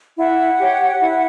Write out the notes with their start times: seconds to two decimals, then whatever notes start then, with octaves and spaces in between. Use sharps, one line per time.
0.18 E4 F#5
0.59 G4 C#5
1.00 E4